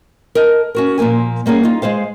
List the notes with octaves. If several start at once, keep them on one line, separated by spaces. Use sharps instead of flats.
A#4 D#5 A5
C#4 F#4 A#4
A#2 F3 A#3 A#4 G#5
G3 A#3 C#4 G#4
D#4 F4
G#3 G#4 C5 F5